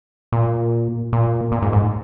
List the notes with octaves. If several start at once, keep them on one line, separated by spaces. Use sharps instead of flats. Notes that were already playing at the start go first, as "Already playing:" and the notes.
A#2
A#2
A#2
G#2
G#2